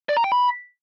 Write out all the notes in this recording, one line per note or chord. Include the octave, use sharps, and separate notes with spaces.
D5
A#5
G5
B5